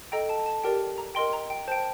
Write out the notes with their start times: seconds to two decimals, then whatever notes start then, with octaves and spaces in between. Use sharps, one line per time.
0.12 A4 D#5 G5 A#5
0.29 A5
0.46 A5
0.64 G4 A#4 D5 G5
0.98 A#5
1.15 A#4 D#5 G5 C6
1.33 A#5
1.50 G5
1.68 C5 G5 A5